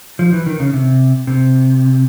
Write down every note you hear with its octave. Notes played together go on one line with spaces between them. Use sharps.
F3
E3
D#3
C#3
C3
C3